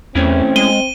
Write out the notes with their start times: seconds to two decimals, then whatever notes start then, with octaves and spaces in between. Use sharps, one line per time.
0.15 E2 A3 C4 C#4 E4
0.56 G#3 D#7 G7